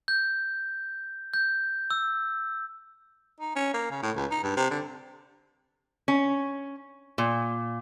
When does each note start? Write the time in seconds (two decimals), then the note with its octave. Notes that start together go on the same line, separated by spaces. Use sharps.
0.08 G6
1.34 G6
1.90 E6
3.40 D#4
3.56 C#4
3.74 A#3
3.91 C#3
4.03 A2
4.16 C#2
4.31 D#4
4.43 G2
4.56 C3
4.71 D3
6.08 C#4
7.18 A#2